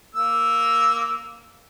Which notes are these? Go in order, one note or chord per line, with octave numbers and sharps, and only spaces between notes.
A#3 E6